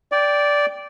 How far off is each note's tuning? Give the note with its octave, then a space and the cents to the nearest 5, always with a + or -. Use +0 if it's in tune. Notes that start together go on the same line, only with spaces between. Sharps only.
D5 -10 G5 +0